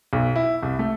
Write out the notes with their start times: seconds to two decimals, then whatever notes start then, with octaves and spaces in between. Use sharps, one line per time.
0.13 B1
0.36 E4
0.63 C2
0.79 A3